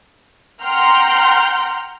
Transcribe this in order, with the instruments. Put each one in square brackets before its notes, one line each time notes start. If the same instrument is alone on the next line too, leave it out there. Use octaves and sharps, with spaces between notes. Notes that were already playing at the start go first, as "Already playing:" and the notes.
[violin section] F#5 G5 A#5 C6 F6 G6